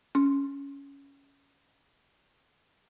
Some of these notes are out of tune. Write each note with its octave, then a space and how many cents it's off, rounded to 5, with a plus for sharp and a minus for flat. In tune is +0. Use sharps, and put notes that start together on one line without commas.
C#4 +10